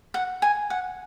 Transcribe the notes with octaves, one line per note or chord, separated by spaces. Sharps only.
F#5
G#5
F#5